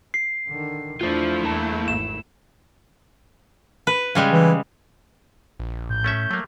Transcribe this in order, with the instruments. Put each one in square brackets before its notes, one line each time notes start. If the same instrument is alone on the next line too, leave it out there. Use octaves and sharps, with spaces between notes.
[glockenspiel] C7
[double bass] D3 D#3
[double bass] E2 D4 [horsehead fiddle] A3 E4 [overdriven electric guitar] F4 C5
[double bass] E2 [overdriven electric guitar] A#3 A5
[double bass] G#1 [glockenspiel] E7
[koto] B4
C#3 G3 G#3
[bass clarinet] E3
[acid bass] A#1
[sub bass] A2 [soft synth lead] G6
[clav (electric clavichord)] A3 C#4 E5
[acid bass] F#3 [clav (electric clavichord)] A3 A#3